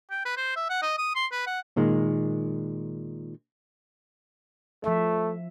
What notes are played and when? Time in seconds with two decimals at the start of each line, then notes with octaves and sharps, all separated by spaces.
0.11 G5
0.25 B4
0.37 C5
0.56 E5
0.70 F#5
0.82 D#5
0.98 D#6
1.16 C6
1.32 B4
1.47 F#5
1.77 A#2 D#3 G#3
4.84 F3 A3 E5